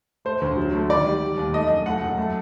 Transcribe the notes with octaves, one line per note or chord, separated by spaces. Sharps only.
A3 C5
D2
F#3
A3
D#3 D5
G3
G3
D#2
A3 D#5
F#2
A3 F#5
F#2
A3